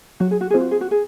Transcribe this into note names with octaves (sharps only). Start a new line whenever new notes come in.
F#3 F#4
G#4
F#4
C4 F4 G#4 C5
F#4
G#4
F#4
G#4